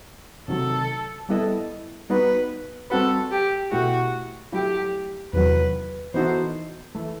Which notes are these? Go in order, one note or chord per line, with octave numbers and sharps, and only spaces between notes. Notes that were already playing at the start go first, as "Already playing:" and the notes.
C3 D#3 F#3 A3 A4
G3 B3 E4 A4 D#5
G3 B3 D#4 F#4 B4
G3 C4 F#4 A4 B4
G4
B2 A3 E4 F#4 G4
F#3 A3 E4 G4
E2 C3 D#3 F#3 B4
E3 B3 D#4 F#4 A4 C5
E3 A3